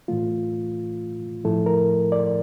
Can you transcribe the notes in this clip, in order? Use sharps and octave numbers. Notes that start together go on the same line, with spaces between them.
A2 E3 A3 F4
A2 F3 A3 E4 A4
A#4
D5